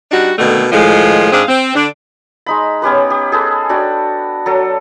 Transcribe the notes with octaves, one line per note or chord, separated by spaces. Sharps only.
G3 D4 D#4 F#4
B2 D3 D#3 A3 A#3
A2 D#3 F3 G#3
G#2 C4 D4 G#4 F5
C4
D3 D4
G#3 D#4 B5
B3 C#4 G4 B4
G4
G#4 A4 B4
D4 F#4 G5
F#3 A4